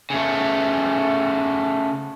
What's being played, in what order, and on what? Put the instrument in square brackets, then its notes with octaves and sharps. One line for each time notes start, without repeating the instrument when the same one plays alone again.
[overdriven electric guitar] C#3 A3